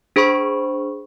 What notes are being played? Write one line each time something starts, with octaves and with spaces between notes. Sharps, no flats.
D4 G#4 C5 B5 C#6